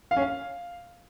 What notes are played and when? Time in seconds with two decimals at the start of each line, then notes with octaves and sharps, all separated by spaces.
0.11 F5
0.16 C#4
0.22 F5